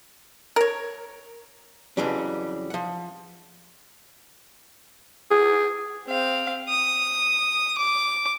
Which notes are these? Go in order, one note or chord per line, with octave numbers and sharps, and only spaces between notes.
A#4 C#5
F2 C#3 E3 F#3 G3 C#4
F3 F#5
G#4
C4 F5
D#6
D6